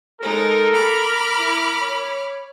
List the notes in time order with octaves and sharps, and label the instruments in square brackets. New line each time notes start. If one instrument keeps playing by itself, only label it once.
[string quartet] G#3 D#4 [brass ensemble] A4 [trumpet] A#4
[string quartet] B5 D6 F6
[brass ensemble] E4
C#5